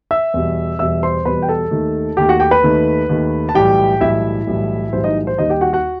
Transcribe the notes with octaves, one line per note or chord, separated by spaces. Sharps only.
E5 E6
E2 B2 G3
E2 B2 G3 E5 E6
C5 C6
E2 B2 G3 B4 B5
G5
A4 A5
D#2 D#3 A3
D#2 D#3 A3 G4 G5
F#4 F#5
G4 G5
B4 B5
D#2 D#3 A3
D#2 D#3 A3
A5
B1 A2 E3 G3 G4 G5
B1 A2 E3 G3 E4 E5
B1 A2 E3 G3
B1 A2 E3 G3 C5
D#4 D#5
C5
D#2 D#3 G3 D#4 D#5
G4 G5
F#4 F#5
F#4 F#5